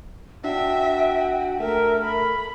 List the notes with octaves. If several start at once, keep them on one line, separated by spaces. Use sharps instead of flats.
D4 F#4 E5 G5
A3 A#4 E5
B5